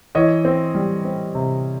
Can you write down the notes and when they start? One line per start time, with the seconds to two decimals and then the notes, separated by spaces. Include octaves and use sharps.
0.15 E3 C#5 D#5
0.45 C4
0.75 G3
1.05 C4
1.35 C3